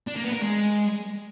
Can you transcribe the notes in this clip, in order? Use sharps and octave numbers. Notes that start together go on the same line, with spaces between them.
D4
A#3
B3
A#4
G#3